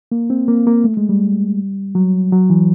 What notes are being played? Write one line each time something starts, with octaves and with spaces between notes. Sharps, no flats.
A#3
C4
A#3
A#3
A3
G#3
G3
F#3
F#3
E3